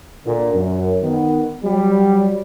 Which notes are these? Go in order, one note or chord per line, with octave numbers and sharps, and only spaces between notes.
A#2 D3
F#2
D#3 B3
F#3 G3